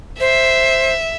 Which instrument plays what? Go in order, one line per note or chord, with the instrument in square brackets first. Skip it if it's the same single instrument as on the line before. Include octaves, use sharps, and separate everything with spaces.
[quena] C5 [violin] E5